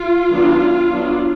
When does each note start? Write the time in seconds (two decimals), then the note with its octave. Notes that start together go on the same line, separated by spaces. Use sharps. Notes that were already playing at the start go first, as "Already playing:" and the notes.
Already playing: F4
0.31 D#3 F#3 B3 D4
0.91 F#3 B3 D4